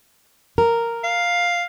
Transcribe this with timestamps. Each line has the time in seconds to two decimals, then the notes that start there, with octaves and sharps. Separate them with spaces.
0.58 A#4
1.04 F5